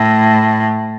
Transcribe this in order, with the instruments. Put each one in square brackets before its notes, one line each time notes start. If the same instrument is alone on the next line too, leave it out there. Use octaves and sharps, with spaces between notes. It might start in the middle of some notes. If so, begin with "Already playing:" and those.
Already playing: [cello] A2